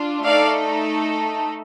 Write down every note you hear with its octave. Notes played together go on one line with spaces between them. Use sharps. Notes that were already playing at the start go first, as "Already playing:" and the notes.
Already playing: D4 F4
A3 D#4 A4 D5 F5